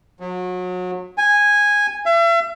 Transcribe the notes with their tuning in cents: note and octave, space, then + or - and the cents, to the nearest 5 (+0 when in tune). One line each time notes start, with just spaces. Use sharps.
F#3 -30
G#5 -10
E5 +40